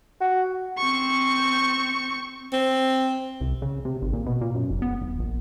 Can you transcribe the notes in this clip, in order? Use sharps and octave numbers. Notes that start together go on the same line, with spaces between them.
F#4
C4 C#6
C4
C2
C#3
C3
G#1
A#2
B2
A#2
F#2
F#1
B3
D#1
A#1